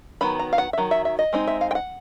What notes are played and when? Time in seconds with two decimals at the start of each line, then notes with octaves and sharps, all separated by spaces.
0.21 D#3 F#3 B3 B5
0.39 A#5
0.53 F5
0.58 F#5
0.73 E5
0.78 D#3 F#3
0.91 E5
1.05 E5
1.19 D#5
1.33 G#3 C4 D#4
1.47 E5
1.61 F5
1.71 G5
1.75 F#5